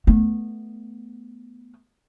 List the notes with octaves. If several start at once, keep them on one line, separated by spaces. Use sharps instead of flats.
A3 B3